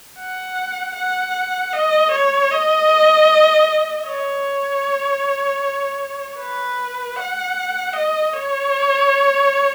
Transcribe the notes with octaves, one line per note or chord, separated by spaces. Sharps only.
F#5
F#5
D#5
C#5
D#5
C#5
B4
F#5
D#5
C#5